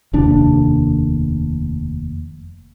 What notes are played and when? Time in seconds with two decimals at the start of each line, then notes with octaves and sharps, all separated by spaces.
0.13 F1 D#2 D4